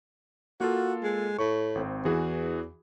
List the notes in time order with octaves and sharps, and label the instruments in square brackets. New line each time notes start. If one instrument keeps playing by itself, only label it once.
[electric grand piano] A#3 F4 A4 [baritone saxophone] F#4
[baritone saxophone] G#3
[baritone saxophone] A2 [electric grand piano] C#6
[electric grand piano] G#1 C4
[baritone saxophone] E2 [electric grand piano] E3 F#4 G#4